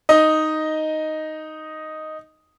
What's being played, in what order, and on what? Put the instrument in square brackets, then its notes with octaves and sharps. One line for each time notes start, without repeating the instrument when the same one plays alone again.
[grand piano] D#4 D#5